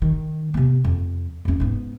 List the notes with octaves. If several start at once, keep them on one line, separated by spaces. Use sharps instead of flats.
D#3
C3 B3
F2
F2 C#4
G#2 B3